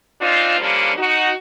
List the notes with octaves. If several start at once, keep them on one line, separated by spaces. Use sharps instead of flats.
C4 D4 D#4 F4
D3 F3 G3 A#3 C#4 D4
D#4 F#4